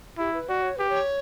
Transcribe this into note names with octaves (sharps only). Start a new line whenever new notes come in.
E4 G4
B4
F#4 D5
C#5
G4 B4
C#5